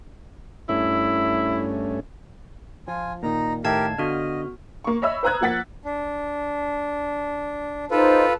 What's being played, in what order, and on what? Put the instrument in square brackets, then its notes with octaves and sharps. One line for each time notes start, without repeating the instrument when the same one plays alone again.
[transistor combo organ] G2 A3 C#4 [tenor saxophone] E4
[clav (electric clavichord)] F3 [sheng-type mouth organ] F4 G#5
[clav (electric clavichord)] A#2 D#3 [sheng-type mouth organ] D#4 A#5
[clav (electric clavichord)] A2 D#3 E5 [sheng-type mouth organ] G4 A#4 [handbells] F5 A5 G#6
[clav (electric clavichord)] D3 F5 [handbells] B3 F#4 F6 [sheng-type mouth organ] D#5
[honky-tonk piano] A#3 C#6
C#5 D#5 E5 B5 E6
B4 C5 A#5 D#6 F#6 G#6
F3 A#3 F#5 A6 B6
[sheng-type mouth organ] D4
[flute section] D#4 C5 [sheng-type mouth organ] F4 A4 B4